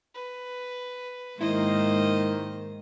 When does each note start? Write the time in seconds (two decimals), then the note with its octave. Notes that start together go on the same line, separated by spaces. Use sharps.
0.14 B4
1.41 G#2 D#3 A#3 E4 C5 D#5